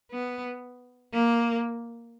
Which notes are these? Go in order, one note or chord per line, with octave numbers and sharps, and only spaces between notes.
B3
A#3